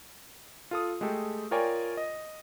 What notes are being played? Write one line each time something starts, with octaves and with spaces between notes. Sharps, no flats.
F4 A4 D#6
G#3 A3 G4 A4
F4 A#4 C#5 D5 G5 G#5
D#5